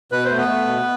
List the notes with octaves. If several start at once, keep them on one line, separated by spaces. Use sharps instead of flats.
B2 B4
C5
A3
B3 B4
A3
B2